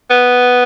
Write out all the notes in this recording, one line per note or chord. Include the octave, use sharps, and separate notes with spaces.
B3